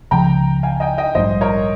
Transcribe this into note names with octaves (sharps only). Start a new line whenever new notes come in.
C#2 C#3 F3 G5 A#5
F5 G#5
D#5 G5
D#5 G5
A#1 G#2 G3 C5 D#5
A#4 C#5